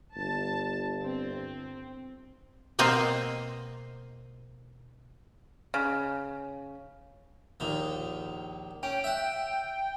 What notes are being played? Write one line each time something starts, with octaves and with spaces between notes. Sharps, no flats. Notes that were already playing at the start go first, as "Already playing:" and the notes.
G1 A5
C4
B2 A#3 C4 C5 D#5
C#3
A#1 D#2 D#3
C#4 G5
E5 F#5